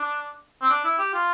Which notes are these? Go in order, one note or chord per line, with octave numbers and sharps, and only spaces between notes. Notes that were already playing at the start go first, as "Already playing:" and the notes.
Already playing: D4
C4
D4
E4
G4
F4